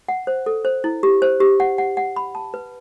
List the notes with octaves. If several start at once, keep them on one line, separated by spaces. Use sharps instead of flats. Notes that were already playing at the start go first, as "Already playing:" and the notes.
F#5
C5
A4
C5
E4
G4
C5
G4
F#5
F#5
F#5
B5
A5
B4